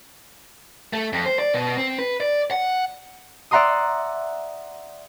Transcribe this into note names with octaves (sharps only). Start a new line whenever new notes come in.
A3
F2
C5
D5
B2
C4
B4
D5
F#5
D5 E5 F#5 A#5 C6 D#6